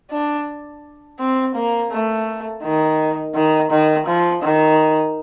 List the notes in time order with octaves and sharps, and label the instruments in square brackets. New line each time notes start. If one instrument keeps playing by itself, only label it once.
[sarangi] D4
C4
A#3
A3
D#3
D#3
D#3
F3
D#3